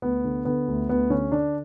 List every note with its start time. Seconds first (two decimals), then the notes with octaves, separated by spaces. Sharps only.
0.02 D2 B3
0.24 D3
0.45 D3 B3
0.68 D2
0.89 D2 B3
1.10 D3 C#4
1.32 D3 D4